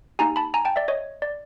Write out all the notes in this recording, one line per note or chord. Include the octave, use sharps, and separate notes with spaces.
A#3 D#4 G4 G#5 A#5
A5 B5
G#5 A#5
G5 A5
D5 E5
C#5 D#5
D5